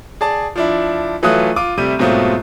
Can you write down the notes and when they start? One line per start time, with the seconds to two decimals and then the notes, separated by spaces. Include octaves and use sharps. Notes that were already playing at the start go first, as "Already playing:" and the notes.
0.21 G#4 D5 A5
0.56 F3 D4 E4
1.23 E3 F#3 A3 F4 D#6 F#6
1.56 F4 D6 D#7
1.77 C3 G3 A3 D#7
1.99 G#2 B2 F#3 A3 C4 F4